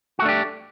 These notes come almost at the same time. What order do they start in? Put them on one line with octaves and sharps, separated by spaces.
F#4 A3 D4 G4